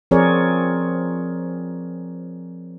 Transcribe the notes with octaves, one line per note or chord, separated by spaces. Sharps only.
F3 C4 G#4 A#4 C#5 D5